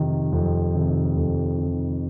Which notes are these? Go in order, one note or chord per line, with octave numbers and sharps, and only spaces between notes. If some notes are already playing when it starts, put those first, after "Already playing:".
Already playing: F2 C3 D#3
F2
C3 D#3
F2
C3 D#3